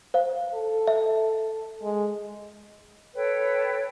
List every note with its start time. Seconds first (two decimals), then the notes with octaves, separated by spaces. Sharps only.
0.14 C5 F5
0.54 A4
0.87 E5
1.82 G#3
3.15 A4 B4 C#5 G5